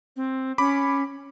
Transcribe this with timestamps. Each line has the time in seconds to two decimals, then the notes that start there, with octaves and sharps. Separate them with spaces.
0.16 C4
0.58 C#4 B5 D6